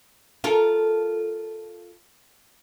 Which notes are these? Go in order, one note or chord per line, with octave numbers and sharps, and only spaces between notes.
F4 A4 A#4